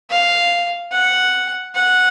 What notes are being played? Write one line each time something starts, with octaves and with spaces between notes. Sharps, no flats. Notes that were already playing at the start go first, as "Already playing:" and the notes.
F5
F#5
F#5